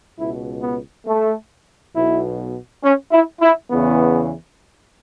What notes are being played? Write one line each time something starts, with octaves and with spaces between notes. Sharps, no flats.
C#2 B2 E4
B3
A3
B1 B2 E4
C#4
E4
E4
E2 C#3 E3 B3